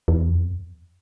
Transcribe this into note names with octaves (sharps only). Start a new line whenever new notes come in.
E2
F2